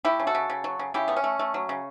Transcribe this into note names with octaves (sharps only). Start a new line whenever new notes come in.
A3 E4 G4
C#3
F#4 A4
C#3
C#3
F#3
C#3
C#3 E4 G4
A3 B3
C#4
A3
A3
F#3
C#3